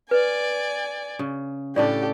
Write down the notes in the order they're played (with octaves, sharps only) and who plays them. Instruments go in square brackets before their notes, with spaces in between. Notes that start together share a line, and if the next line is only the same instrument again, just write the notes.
[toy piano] B4 [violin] D5 G#5
[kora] C#3
[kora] A2 C#3 D4 [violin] G4 A4 [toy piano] D5